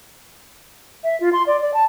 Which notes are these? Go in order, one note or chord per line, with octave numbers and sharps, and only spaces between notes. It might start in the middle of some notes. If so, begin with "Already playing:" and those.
E5
F4
C6
D5
D5
A5